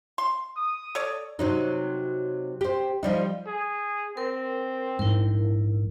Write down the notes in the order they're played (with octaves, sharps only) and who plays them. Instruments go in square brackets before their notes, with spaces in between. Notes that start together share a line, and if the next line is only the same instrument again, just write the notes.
[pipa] C6
[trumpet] D#6
[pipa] A4 C#5 D5
[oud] C3 F#3 D#4
G4 C5
F3 G3 D#4
[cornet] G#4
[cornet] C4 [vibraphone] A#4
[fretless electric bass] A#1 G#2 [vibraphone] E4 A#4